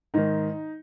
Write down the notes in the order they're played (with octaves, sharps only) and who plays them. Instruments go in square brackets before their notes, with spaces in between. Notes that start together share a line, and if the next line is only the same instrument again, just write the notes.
[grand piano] G#2 D#3 D#4